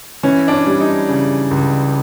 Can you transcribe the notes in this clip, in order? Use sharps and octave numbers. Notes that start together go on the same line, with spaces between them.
E3 C#4
D4
C#4
G3
D#4
C#3
C#2